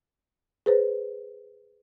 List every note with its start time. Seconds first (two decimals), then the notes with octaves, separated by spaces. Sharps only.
0.66 G#4 B4 C5